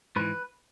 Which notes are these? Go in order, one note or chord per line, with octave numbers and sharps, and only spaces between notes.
G#2 E3 B4